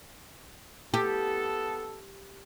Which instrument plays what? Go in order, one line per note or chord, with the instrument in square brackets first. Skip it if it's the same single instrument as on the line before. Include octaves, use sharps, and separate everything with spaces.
[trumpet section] B3 A4 [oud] G4